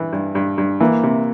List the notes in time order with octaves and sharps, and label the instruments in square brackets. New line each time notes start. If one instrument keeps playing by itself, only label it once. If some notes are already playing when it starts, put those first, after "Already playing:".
Already playing: [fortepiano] G2 E3
G2
G2
G2
[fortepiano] E3 [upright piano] A#3
[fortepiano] C3